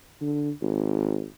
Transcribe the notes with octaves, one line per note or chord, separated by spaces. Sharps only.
D3
G#1